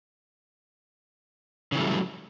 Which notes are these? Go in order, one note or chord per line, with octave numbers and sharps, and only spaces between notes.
C#3 E3 F#3 G3 A3